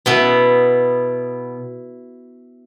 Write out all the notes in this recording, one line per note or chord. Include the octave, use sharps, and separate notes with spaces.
B2 B3 E4